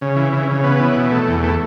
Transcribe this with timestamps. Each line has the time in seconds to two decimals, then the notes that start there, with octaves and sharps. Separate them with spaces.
0.01 C#3
0.16 E3
0.33 C#3
0.48 C#3
0.64 B3
0.80 E3
0.96 B2
1.12 A3
1.28 E2
1.43 A3